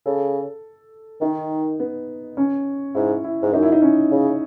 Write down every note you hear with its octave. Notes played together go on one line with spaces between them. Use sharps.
C#3 A4
D#3 D#4
B3
C#4
G#2 E4
E4
G#2
F#2 D#4
E4
D#4
C#4
C#3